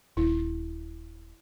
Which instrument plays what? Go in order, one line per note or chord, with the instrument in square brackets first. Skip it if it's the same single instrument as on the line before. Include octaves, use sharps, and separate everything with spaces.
[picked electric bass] D#1 [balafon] E4